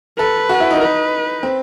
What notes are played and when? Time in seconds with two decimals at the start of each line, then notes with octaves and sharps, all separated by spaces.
0.19 A4 B4
0.49 F#4
0.60 E4
0.71 D#4
0.81 D#4 B4
1.43 C4